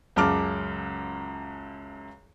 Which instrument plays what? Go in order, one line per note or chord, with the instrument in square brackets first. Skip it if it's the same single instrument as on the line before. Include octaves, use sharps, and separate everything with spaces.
[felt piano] C#2 F#2 C#3 A5 D6 F6